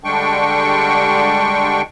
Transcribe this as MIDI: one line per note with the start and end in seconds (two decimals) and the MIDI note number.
0.04 1.82 50
0.04 1.82 55
0.04 1.82 56
0.04 1.82 62
0.04 1.82 79
0.04 1.82 85